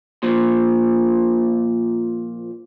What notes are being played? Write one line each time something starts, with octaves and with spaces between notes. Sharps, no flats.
A#2 F3